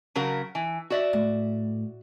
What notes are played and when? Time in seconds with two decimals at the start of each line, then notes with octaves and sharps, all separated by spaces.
0.15 C#3 F#3 A#4
0.55 E3
0.90 F#4 D5 E5
1.13 A2